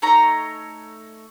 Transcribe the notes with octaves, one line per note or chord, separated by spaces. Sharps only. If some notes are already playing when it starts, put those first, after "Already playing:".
A3 D#4 C#5 A#5